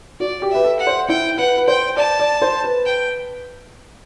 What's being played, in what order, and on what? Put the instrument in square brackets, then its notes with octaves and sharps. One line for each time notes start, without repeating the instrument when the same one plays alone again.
[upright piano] F#4 [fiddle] D5
[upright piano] G4
[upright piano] B4 [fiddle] E5
[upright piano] A4
[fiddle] F#5
[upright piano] C5
[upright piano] E4 [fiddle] G5
[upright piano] B4 [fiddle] F#5
[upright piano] B4
[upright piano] C5 [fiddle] G5
[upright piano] D5 [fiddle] A5
[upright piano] D5
C5
B4
[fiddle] G5